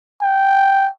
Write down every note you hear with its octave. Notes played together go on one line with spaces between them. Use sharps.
G5